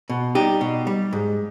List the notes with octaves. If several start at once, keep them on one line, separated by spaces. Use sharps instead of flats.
B2
G3 D#4 G4
B2
G3
G#2